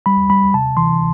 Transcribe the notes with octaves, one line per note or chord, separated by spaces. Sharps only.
G3 B5
G3 B5
C3 A5
E3 C6